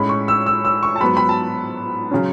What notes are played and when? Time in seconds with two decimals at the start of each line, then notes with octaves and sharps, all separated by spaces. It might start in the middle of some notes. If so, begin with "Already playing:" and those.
Already playing: A2 G#3 C#4 B5
0.09 C#6
0.28 E6
0.46 E6
0.65 E6
0.83 C#6
0.96 A5
1.01 G#2 F#3 B3 B5
1.17 B5
1.29 A5
2.11 C#3 F#3 C#4